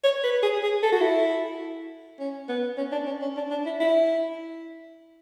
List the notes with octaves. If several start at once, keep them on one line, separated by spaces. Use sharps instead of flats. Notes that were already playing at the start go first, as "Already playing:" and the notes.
C#5
B4
G#4
G#4
A4
F#4
E4
C#4
B3
C#4
D4
C#4
C#4
D4
D4
E4
E4